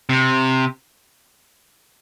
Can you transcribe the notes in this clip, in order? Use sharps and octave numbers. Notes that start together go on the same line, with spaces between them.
C3